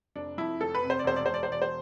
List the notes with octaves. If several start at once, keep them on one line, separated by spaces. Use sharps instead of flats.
F1 D4
F2 E4
F1 A4
B4
C3
C5
D5
E1 C5
D5
E1 C5
D5
C5
E1 D5
C5